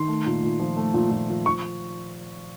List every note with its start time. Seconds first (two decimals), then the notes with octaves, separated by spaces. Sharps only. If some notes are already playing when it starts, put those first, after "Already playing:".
Already playing: D#3 C6
0.08 A3
0.26 A#2
0.43 A#2
0.60 F3
0.77 A3
0.94 A#2
1.11 A#2
1.30 F3
1.46 F3 C#6